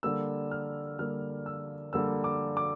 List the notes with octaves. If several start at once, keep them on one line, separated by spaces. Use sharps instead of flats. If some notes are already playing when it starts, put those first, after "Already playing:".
D3 G3 A#3 E6
F6
D3 G3 A#3 F6
E6
D3 G3 A#3 E6
D6
D6